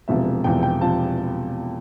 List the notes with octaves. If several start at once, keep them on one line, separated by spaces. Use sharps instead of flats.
E1 E2 C3 F3 E5
E1 E2 C3 F3 G5
G5
C3 F3 A5